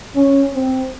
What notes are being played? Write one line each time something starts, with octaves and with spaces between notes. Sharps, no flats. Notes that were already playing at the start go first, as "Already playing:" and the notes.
C#4
C4